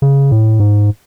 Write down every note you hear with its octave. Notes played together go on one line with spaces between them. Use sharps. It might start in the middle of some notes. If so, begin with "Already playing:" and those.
C#3
A2
G#2